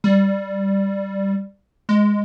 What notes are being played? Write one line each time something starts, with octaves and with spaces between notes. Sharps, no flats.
G3
G#3